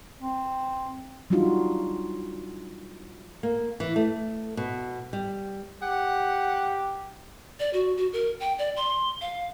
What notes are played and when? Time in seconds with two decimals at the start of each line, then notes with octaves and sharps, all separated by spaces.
0.20 C4
1.30 F#3 G3 D4 D#4 F4 F#4
3.43 A#3
3.80 E3
3.96 A3
4.57 B2
5.13 G3
5.83 G4 F#5
7.60 D5
7.73 F#4
7.97 F#4
8.13 A#4
8.40 G5
8.59 D5
8.76 C6
9.21 F5